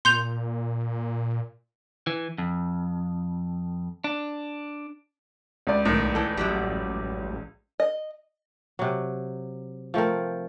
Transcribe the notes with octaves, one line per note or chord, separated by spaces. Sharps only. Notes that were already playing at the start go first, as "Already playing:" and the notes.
A#2 C6 G6 F7
E3
F2
D4
C#2 D5
B1 A2 D#3
E3 A4
A1 F#2 F#3 G3
D#5
C3 F#3
F3 A3 C4 A#4